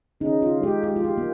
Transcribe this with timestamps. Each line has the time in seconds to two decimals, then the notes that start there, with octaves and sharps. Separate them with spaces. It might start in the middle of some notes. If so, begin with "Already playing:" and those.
0.21 C#3 D#4
0.42 F4
0.63 G#3 G4
0.83 G4
0.96 F4
1.04 G4
1.18 A#3